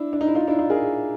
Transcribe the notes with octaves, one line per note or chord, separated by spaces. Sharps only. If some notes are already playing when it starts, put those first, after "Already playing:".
Already playing: D4 E4
D4
D#4
E4
D#4 F4
D4 E4
D#4 F4
G#4 A#4